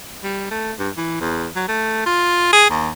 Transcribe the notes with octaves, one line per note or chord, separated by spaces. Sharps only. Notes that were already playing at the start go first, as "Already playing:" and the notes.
G3
A3
G2
E3
E2
F#3
A3
F4
G#4
D#2